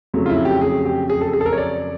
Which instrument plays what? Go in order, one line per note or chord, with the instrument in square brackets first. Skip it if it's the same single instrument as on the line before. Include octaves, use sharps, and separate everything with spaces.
[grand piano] F2 C#3 F#3 A3
F4
E4
G4
G#4
G4
G#4
A4
G#4
A4
A#4
C#5
D5